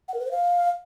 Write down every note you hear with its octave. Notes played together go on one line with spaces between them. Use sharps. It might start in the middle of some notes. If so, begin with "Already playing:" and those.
F#5
A#4
B4
C5
F5